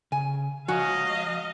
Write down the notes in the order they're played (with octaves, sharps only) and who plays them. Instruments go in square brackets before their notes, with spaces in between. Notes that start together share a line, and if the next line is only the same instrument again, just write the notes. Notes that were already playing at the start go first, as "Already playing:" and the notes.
[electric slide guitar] C#3 [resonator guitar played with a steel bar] G#5
[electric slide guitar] F3 C#5 [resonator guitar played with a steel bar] F#4 [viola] D#5 F5 [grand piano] G#5